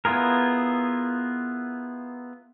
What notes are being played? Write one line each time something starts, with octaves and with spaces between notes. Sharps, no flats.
B3 E4 F4 G#4 A#4